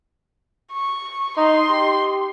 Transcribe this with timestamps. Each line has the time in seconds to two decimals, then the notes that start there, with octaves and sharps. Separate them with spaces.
0.73 C#6
1.37 D#4 C6
1.70 G4